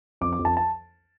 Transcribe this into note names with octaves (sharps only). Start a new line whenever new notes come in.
F2 D6
D6
F2
A5
A5